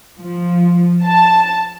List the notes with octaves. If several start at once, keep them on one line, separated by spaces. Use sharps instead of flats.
F3
A5